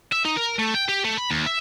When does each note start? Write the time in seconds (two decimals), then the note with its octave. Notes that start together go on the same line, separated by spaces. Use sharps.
0.13 E5
0.25 D#4
0.37 A#4
0.59 A3
0.75 G5
0.88 G4
1.04 A3
1.17 B5
1.31 D#2
1.46 E5